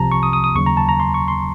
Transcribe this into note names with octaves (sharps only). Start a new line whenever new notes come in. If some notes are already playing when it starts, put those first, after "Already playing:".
Already playing: C2 C3 F3 A5 A#5
C#6
D#6
D#6
D#6
D#2 C#3 F#3 C#6
A#5
A5
A#5
C6
C#6
C6